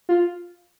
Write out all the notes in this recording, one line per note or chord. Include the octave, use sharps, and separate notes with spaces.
F4